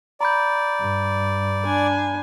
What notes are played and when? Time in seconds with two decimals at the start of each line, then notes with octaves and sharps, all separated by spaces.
0.21 D5 A#5 B5 G6
0.79 G2
1.65 D4 G#5